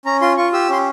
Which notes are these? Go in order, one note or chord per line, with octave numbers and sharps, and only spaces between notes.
C#4 A#5
F4 C6
F4 C#6
G4 E6
C#4 C6